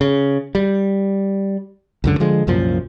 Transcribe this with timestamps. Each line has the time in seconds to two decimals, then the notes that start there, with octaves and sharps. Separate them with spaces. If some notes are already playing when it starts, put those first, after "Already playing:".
0.01 C#3
0.55 G3
2.04 C#2 F#2 D3
2.20 D3 F3 G#3
2.47 C2 F#2 A#2 F3